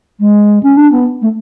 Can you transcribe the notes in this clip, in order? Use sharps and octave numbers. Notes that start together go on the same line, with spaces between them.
G#3
C#4
D4
B3
A3